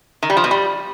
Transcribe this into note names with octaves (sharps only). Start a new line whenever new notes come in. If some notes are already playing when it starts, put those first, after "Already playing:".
D#3
G3
F3
B2
G3